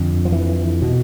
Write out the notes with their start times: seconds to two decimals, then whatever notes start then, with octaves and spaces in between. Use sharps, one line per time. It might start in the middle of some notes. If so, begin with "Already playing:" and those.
Already playing: F2 D3
0.25 F3
0.32 E3
0.82 B2